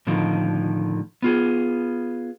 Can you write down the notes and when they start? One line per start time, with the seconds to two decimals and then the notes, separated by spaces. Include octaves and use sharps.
0.07 A2 D3 D#3 F3
1.22 B3 F4 G#4